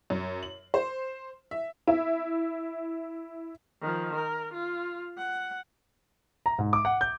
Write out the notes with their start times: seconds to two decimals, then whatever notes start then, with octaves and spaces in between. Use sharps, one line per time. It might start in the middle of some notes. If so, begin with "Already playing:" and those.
0.10 F#2
0.43 F#7
0.74 C5
1.51 E5
1.87 E4 E5
3.82 D#3 F3
4.16 A#4
4.54 F4
5.18 F#5
6.46 A#5
6.58 G#2
6.73 D6
6.85 F#5
7.01 G6